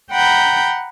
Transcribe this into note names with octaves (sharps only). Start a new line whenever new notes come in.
F#5 G5 A#5 B5 G6